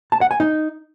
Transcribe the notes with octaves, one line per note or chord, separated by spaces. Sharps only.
A5
F#5
G#5
D#4